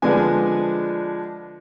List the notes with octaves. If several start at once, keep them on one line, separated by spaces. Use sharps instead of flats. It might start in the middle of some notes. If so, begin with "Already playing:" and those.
D3 F3 G#3 B3 D4 G#5